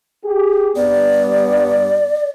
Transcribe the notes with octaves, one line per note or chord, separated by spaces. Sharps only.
G4 G#4
G2 B3 D5